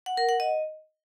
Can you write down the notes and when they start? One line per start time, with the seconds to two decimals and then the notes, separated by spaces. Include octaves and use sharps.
0.06 F#5
0.17 A#4
0.29 F#5
0.40 D#5